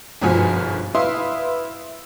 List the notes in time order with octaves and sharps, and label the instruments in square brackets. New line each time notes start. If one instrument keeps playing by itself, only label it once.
[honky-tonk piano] G1 G#2 B2 F3 F#4 G#5
E4 B4 F5 C6 D#6